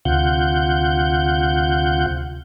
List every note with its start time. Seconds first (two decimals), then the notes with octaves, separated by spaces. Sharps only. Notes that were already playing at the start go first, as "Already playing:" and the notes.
0.05 D2 C3 F4 F#5 G6